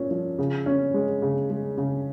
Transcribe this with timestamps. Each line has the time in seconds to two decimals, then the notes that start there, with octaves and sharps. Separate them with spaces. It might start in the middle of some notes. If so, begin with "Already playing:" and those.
Already playing: A#2 C#4
0.11 F3
0.38 C#3
0.66 C#4
0.94 G#3
1.22 C#3
1.50 G#3
1.77 C#3